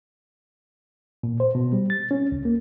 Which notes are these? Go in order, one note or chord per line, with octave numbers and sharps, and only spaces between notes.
A#2
C5
B2
G3
A6
C#4
C#2
A#3